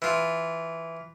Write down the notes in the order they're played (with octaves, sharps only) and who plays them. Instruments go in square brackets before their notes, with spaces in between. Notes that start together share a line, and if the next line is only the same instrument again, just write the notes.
[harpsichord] E3 F4